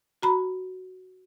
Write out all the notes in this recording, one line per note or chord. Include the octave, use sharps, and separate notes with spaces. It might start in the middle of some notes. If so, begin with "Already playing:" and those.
F#4 A#5 B5